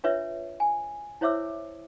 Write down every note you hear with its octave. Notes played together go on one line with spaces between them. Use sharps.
D4 F4 B4 C#5 E5
G#5
E4 C5 C#5 E5 D6 E6